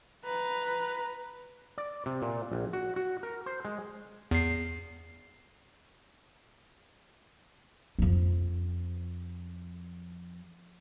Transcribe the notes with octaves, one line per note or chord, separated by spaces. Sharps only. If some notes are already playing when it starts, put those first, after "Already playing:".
B4 A#5
D5
C3
A#2
A#1
F#4
F#4
A#4
C5
G#3
E2 C7
F2 F3